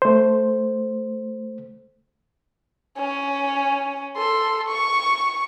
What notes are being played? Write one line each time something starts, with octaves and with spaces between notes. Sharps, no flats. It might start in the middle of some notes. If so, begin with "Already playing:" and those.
A3 C5
C#4
A4 C6
C#6